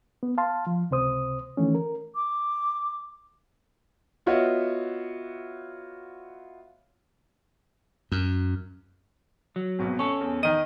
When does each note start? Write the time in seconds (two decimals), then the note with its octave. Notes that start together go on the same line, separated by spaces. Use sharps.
0.23 B3
0.38 F5 A5 C6
0.67 F3
0.91 C#2 C3 C5 D#6
1.57 D#3 E3 A3 C#4
1.75 A#4
2.15 D6
4.26 B3 F4 F#4 C#5 D#5 E5
8.12 F#2
9.56 F#3
9.79 G#1 B2
9.99 C#4 A4 C#6
10.21 E2
10.43 D#3 D#5 D#7